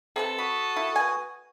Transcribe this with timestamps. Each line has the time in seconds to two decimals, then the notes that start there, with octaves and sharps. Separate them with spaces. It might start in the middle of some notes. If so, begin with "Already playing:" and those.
0.16 C3 C4 A4 B4
0.38 F#4 B5 D#6
0.76 E4
0.96 B4 G#5